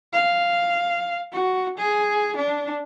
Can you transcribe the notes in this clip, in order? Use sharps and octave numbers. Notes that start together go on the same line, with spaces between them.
F5
F#4
G#4
D4